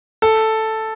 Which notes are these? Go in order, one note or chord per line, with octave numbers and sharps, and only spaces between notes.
A4